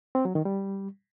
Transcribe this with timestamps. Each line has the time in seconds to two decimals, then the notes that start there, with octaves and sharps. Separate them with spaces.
0.15 C4
0.25 F#3
0.35 D#3
0.45 G3